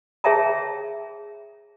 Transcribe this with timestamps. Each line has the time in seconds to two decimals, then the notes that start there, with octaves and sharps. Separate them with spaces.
0.24 G#4 C#5 E5 G5 A5 A#5